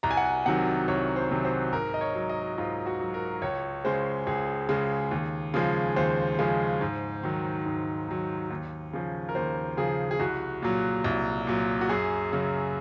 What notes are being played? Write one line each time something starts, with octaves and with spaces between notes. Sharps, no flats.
C2 A#5
G#5
F#5
G#5
C3 D#3 F#3 F#5
C2 C#5
C5
C3 D#3 F#3
C5
G#2 A#4
D#5
C#5
F#3
D#5
G#2 F4
F#4
F#3
A#4
C#2 C#5
C#3 G#3 C5
C#2 G#4
C#3 G#3
D#2
C#3 F3 G#3
D#2 C5
C#3 F3 G#3
G#2
D#3 F#3
G#2
D#3 F#3
D#2
C#3 F3
A#4
D#2 C5
C#3 F3 G#4
G#4
C2 F#4
A#2 F#3
C2
A#2 F#3
F#4
F#2 G#4
C#3 F#3